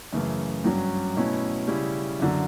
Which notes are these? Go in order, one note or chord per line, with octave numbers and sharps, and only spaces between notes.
F#2 C#3 E3 A3
G2 F#3 C#4
B2 A3 C#4 E4
C#3 G3 C#4 E4
F#2 D3 F#3